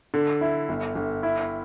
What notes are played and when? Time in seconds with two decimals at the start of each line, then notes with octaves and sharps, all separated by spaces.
0.14 D3
0.41 E4
0.69 G1
0.95 G1
1.23 E4